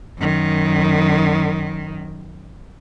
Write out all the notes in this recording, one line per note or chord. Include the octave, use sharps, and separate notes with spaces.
F#2 D#3